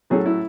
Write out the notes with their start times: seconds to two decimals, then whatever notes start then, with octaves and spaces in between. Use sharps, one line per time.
0.10 A2 F#3 A3 C#4 G#4
0.26 E4